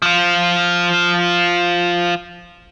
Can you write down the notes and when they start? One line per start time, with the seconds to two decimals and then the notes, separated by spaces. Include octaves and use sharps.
0.02 F3 F4